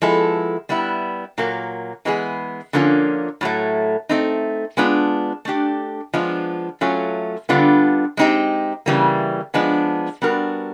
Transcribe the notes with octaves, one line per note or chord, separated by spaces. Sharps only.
F3 G#3 B3 E4 A4
G3 B3 E4
A#2 F#3 A#3
E3 G#3 B3 D#4 G#4
D3 F3 A#3 C#4 F4
A2 F#3 A3
A3 C4 D#4
G#3 B3 D4 F4
A3 D4 G4
F3 G#3 B3 D4 F4
F#3 A3 C#4 F4
D3 G3 B3 D4 F4
G#3 C4 D#4 G4
C#3 E3 G3 A#3
F3 G#3 B3 D4
G3 B3 D4 F#4 A#4